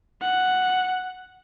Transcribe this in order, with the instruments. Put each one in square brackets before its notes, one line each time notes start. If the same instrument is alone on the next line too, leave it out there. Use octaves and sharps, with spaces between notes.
[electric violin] F#5